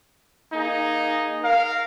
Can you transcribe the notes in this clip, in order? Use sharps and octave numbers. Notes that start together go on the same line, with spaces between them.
A#3 D#4 G#4
A#4 F5